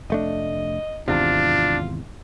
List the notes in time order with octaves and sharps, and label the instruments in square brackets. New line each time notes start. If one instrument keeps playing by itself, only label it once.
[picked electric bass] F1 A3 D4 [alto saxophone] D#5
[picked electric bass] G#1 E2 C3 [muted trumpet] D4 [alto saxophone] F4